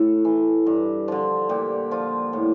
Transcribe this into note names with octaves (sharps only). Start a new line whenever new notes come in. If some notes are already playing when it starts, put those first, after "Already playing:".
Already playing: A2 A4
E3
G2
D3 F3
A#2 G4
F3 F4
A2